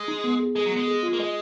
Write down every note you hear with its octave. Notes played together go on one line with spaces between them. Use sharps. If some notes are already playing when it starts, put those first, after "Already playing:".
Already playing: G#3
D#4
B3
G#4
G#3 G#4
F#3
G#3 B3
G#4
F4
A#3
G#3 D#5